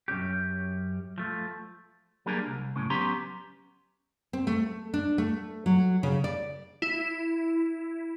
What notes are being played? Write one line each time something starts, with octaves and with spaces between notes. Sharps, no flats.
F#2 B2 C#4 G4
F3 A3
F#3 G3 A#3 D4 G#4 A#4
C2
F#2 A2 C#3
F#3 B3 C#4 G4 A#5 C6
C4
A3
D4
A3
F#3
C#3
D5
E4